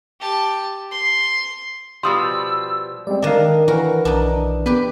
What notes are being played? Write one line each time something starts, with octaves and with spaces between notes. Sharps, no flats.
G4 A5
C6
B2 F3 G3 C6 D#6 E6
G3 G#3 C4 D5
D#3 D4 D#5 F5
E3 F#4 A#4
B1 D4 D#4
B3 G4 B4